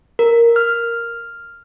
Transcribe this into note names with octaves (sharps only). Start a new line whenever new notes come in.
A#4
F6